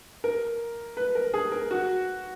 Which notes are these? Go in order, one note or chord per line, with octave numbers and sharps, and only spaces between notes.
A#4
B4
A#4
G#4
A#4
F#4